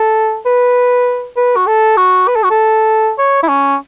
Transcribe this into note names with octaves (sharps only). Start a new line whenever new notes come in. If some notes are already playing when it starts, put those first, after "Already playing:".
Already playing: A4
B4
B4
F#4
A4
F#4
B4
A4
F#4
A4
C#5
E4
C#4